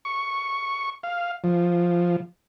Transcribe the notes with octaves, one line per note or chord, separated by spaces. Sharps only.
C#6
F5
F3